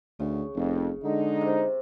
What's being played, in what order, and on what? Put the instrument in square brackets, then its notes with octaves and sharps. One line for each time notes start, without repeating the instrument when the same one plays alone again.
[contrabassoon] D2 [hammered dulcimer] C#3
[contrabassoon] F1 [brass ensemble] F2
[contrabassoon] D3 [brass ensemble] G#3 D#4
[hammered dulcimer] C3